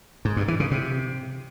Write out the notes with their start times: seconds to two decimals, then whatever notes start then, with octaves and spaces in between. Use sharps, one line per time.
0.25 G#2
0.37 G2
0.48 E3
0.60 C#3
0.71 C3